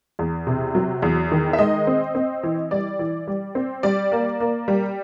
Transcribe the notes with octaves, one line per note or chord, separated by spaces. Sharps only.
E2
C3
F#3
E2
D#3
E5
G#3 D#5
C4
C4
E3
G3 D5
E3
G3
C4
G3 D5
A#3
A#3
G3